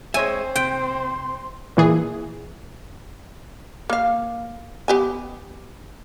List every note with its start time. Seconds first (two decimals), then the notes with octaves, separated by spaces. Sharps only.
0.14 G#3 C4 C5 C#5 E5 G#5
0.56 C3 G5 C6
1.77 A#2 E3 G#4
3.90 A#3 F5
4.88 B3 G4 G#5